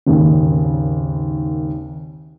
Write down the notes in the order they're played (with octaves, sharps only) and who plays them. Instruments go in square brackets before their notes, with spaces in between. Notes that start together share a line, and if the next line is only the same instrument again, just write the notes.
[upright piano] G#1 D#2 C#3